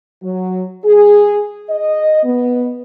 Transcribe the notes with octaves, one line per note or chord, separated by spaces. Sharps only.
F#3
G#4
D#5
B3